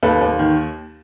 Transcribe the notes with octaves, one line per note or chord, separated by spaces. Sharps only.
D#2 A4 B4
D#2
D#3